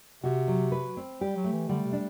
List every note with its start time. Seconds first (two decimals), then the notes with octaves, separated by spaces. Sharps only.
0.24 C3 F#4
0.48 F#3
0.72 B4
0.97 C4
1.21 G3 G4
1.37 F#3
1.44 A3
1.53 E3
1.69 D3 G3
1.85 C3
1.93 D4